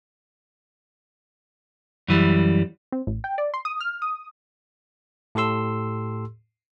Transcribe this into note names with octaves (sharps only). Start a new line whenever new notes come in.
F#2 E3 G3
C4
A1
G5
D5
C6
D#6
F6
D#6
A2 G4 A4 C6 E6